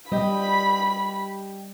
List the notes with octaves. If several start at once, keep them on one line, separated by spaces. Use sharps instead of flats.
G3 G4 D#5 B5